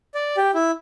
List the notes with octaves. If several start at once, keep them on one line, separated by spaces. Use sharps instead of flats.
D5
G4
E4